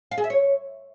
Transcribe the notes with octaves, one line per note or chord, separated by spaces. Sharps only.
F5
G#4
E5
C#5